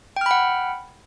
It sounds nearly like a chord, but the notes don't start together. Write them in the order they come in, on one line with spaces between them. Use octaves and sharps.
G5 F6 B5 F#5